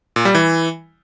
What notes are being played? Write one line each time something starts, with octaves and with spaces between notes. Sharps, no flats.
A#2
G3
E3